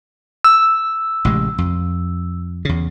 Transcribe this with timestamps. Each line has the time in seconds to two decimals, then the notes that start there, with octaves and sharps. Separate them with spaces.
0.44 E6
1.25 A1 C3 G#3
1.58 F2
2.65 E2 C#3